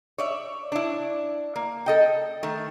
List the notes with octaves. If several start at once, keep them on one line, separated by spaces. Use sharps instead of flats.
C#5 D5 E5
D4 E4
A#3
A4 D#5 G5
D#3 A3